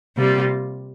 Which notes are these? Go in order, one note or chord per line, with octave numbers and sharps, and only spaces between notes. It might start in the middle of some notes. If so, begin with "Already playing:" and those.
C3 G3 A#3 F4